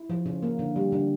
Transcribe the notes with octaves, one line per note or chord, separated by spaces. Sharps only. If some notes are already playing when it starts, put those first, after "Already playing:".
Already playing: E4
F3
C#3
A#3
D3
G3
D3